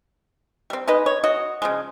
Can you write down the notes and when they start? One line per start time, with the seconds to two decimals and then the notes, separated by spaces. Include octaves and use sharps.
0.70 G3 C4
0.87 G#3 D#4 B4 D#5
1.06 C#5
1.24 F#4 D#5
1.62 C#3 F3 G#3